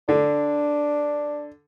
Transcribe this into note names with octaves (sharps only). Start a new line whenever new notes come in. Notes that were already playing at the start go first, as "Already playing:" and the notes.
D3 D4